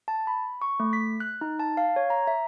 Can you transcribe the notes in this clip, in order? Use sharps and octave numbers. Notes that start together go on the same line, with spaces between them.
A5
B5
C#6
A3
B6
F#6
D#4
A5
F5
C#5
A#5
E5